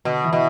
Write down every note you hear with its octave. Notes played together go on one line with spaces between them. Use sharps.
B2 D3
E3
B2